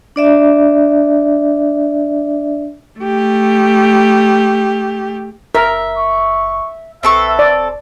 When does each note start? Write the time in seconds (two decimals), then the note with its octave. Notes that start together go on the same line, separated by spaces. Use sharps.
0.16 D4 D5 E5
2.99 A3 G4
5.55 F#1 A#4 E5
5.97 C#6
7.03 A#1 C4 A4 B4 E5 C#6
7.39 D#1 D5